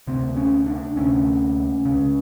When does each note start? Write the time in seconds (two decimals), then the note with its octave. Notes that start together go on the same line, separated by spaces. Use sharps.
0.07 D2 C3 C4
0.37 C#4
0.66 D4
0.96 D2 C3 C#4
1.85 C#2 C#3